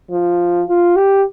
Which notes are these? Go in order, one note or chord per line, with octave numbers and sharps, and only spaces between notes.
F3
F4
G4